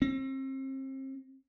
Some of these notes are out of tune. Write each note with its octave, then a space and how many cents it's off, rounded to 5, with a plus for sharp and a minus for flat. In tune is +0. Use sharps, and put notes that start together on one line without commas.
C4 +35